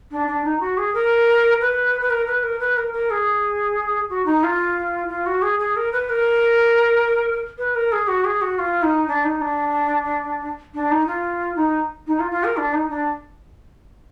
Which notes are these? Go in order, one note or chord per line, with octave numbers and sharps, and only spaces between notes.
D4
D4
D#4
F#4
G#4
A#4
B4
B4
A#4
B4
A#4
B4
A#4
A#4
G#4
F#4
D#4
F4
F4
F#4
G#4
G#4
A#4
B4
A#4
B4
A#4
G#4
F#4
G#4
F#4
F4
D#4
D4
D#4
D4
D4
D#4
F4
D#4
D#4
F4
F4
A#4
D4
D#4
D4